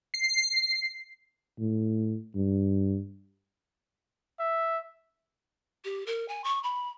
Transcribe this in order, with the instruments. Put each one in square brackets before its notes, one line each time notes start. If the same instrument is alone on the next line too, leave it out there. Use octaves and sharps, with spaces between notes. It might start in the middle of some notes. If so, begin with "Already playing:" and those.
[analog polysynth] C7
[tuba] A2
G2
[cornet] E5
[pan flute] G4
A#4
G#5
C#6
B5